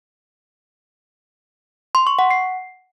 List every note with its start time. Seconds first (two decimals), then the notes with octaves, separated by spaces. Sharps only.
1.95 C6
2.07 C#6
2.19 F#5
2.31 C7